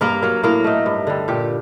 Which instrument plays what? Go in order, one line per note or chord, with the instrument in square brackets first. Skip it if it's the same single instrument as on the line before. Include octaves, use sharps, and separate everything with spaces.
[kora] G2 A#3 A#4
F#3 A#3
A2 A#3 A#4
A3 D#4
G2
D3 G3
A#2 G4